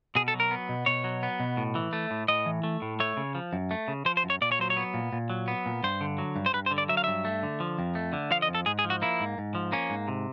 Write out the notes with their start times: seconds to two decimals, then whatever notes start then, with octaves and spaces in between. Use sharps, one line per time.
0.15 B2 G#4
0.28 A4
0.34 F#3
0.40 A#4
0.51 B3
0.69 B2
0.86 B2 C#5
1.04 F#3
1.23 B3
1.40 B2
1.57 A2
1.75 E3
1.93 A3
2.11 A2
2.28 A2 D#5
2.46 E3
2.63 A3
2.82 A2
3.00 A3 C#5
3.17 C#3
3.35 F3
3.53 F#2
3.71 A3
3.88 C#3
4.05 F3 C5
4.17 C5
4.24 F#2
4.30 C#5
4.41 A#2 D5
4.52 C#5
4.59 F#3 C5
4.70 C#5
4.77 B3
4.94 A#2
5.13 A#2
5.30 F#3
5.48 B3
5.66 A#2
5.83 G2 C5
6.01 D3
6.18 F#3
6.36 G2
6.46 C5
6.53 G2 B4
6.66 C5
6.71 D3
6.78 D5
6.89 F#3 E5
6.97 F5
7.04 G2 E5
7.25 A3
7.43 D3
7.60 F3
7.79 F2
7.95 A3
8.13 D3
8.31 F3 F5
8.42 D#5
8.48 F2
8.55 A4
8.66 G#2 G#4
8.79 G#4
8.84 F3
8.90 F#4
9.02 A#3 E4
9.20 G#2
9.38 G#2
9.55 F3
9.72 A#3 C#4
9.90 G#2
10.08 C3